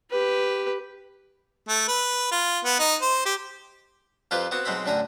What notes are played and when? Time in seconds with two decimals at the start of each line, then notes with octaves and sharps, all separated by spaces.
0.11 G4 B4
1.68 A3
1.88 B4
2.32 F4
2.64 B3
2.79 D#4
3.02 C5
3.25 G4
4.31 F2 E4 F4 G4 B4 C5
4.51 B3 C4 E4 F#4
4.65 B1 F#3 G#3 C4 E4 B5
4.86 F#2 A2 D3 E5 G#5 A#5